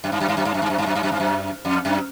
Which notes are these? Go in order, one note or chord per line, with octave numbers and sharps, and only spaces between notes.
F#2
G2
F#2
G2
F#2
G2
F#2
G2
F#2
G2
F#2
G2
F#2
G2
F#2
F2
F#2